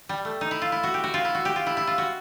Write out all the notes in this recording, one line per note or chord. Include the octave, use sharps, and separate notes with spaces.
G3
A3
D#4
E4
F4
E4
F#4
G4
F#4
F4
E4
F#4
G4
F4
E4
E4
F4
F#4